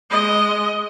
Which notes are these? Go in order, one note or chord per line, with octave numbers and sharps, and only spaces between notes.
G#3 D#5